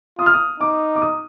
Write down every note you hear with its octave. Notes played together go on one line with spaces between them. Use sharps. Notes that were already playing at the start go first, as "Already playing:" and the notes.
F4 D#6
F6
D#6
D#4 D6
D6
D#6